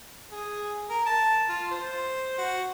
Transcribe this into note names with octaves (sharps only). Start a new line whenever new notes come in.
G#4
A#4
A5
F4
C5
F#4